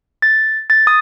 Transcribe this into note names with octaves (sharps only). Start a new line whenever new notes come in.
A6
A6
D#6